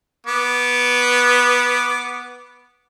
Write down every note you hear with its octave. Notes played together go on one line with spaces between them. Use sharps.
B3 D6